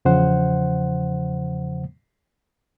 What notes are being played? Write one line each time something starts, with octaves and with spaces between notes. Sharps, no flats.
E2 C#3 F3 C5 F#5